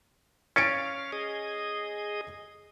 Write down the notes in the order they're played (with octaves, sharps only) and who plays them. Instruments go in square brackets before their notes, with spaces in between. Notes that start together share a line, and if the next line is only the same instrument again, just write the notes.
[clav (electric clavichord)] C#4 [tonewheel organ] F5 [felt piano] A6 C#7 D7
[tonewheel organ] G#4 D#5